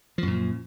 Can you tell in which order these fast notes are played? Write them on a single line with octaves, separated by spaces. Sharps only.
F3 F#2 A#2